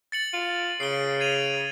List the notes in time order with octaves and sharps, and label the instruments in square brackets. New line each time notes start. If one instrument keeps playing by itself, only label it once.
[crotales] A6 C#7 F#7
[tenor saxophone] F4
[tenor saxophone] C#3 [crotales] C7 D7 G7
[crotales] G#6 D#7 F7